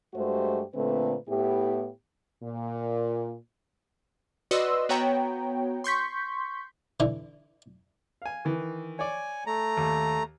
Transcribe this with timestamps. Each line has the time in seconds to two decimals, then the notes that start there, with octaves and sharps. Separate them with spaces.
0.14 G2 G#3 A3 F#4 G4 C5
0.75 A#2 D3 A3 C4 B4
1.28 A2 B3 E4 G4
2.42 A#2
4.51 F#4 B4 D5 D#5 C6 E6
4.89 B3 F#4 C#5 G5 A#5
5.84 C6 C#6 G6 B6
7.00 D3 E3
8.22 F5 G#5
8.45 D#3 E3
8.99 C#5 D5 G#5
9.47 A3 A#5
9.77 D#2